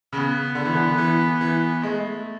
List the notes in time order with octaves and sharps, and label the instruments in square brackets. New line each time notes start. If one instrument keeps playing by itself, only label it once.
[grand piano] C#3 [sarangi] B3
[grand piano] D3
E3
D3
E3
E3
[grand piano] G#3 [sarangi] A3